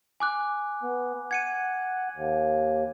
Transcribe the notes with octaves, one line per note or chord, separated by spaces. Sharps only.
G#5 D6 F#6
B3
F#5 G#6 C#7 D#7
D#2